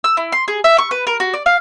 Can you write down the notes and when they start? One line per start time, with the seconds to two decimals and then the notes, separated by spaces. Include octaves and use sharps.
0.04 E6
0.17 E4
0.32 C6
0.48 G#4
0.64 E5
0.78 C#6
0.91 B4
1.07 A#4
1.20 F#4
1.34 D5
1.46 F5